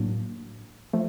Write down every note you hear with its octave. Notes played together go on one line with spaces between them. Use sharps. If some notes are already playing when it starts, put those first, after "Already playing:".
Already playing: A2 F#3 A#3 D4 F#4
F3 A3